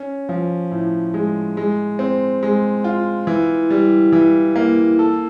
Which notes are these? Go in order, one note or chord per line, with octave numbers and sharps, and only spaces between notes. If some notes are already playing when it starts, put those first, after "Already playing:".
Already playing: C#4
F3
A2
G#3
G#3
C4
G#3
F4
E3
G3
E3
A#3
A4